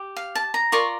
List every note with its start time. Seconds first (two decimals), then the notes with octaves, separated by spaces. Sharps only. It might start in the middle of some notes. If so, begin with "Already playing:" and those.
Already playing: G4
0.17 F5
0.35 A5
0.54 A#5
0.72 F4 A#4 D5 C#6